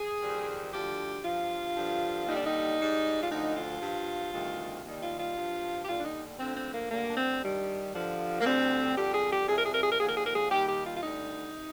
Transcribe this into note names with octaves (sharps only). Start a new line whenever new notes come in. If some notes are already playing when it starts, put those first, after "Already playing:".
Already playing: G#4
F2 D#3 G3
D2 D3 F3 G4
G2 F3 F4
G2 D3 F3
D#2 D3 G3 D#4
D4
D#4
G#2 G3
F4
D2 D3 F3 D#4
F4
G2 F3
D2 C3 D#3 G3
D#2 D#3 G3
F4
F4
G2 F3
G4
D#2 D3 G3 F4
D4
D#4
D2 D3 F3 C4
C4
A#3
D2 D3 G3 A#3
D4
C4
G2 D#3 G3
G2 D3 F3
A#3
D2 D3 G3 C4
F2 D3 G3 G4
G#4
G4
F2 C3 G3 G#4
A#4
G#4
A#4
G#4
A#4
D#2 D3 F3 G#4
A#4
G#4
A#4
G#4
D#2 D#3 G3 G4
G4
F4
F4
D2 D3 G3 D#4
C3